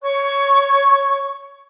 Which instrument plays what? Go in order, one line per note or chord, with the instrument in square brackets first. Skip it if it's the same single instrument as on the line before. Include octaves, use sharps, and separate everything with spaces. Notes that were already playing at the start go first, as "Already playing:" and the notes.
[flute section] C#5 C#6